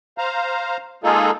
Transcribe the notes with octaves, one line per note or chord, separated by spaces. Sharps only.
C5 F5 A#5
G#3 A#3 D#4 F4 G#4 A4